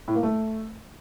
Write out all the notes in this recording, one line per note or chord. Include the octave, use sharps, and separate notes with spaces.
A2
A#3
A3